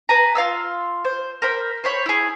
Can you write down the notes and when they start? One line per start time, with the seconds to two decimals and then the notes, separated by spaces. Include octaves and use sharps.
0.09 B4 G#5 A#5
0.35 F4 F5 C6 E6
1.05 C5
1.42 A#4 C5 B5
1.84 C5 C#5 B5
2.06 E4 G#4